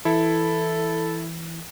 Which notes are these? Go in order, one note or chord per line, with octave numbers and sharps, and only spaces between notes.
E3 E4 A4